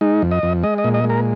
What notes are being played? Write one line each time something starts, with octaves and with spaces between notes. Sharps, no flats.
G#3 D#4
F2
D#5
F2
G#3 D#5
D#5
A#2
D#5
G#3
A#4